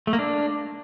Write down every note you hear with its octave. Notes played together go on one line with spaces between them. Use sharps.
A3
A#3
D4